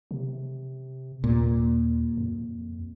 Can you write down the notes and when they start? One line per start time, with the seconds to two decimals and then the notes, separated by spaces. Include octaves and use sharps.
0.11 C3
1.24 D#2 A#2
2.17 F2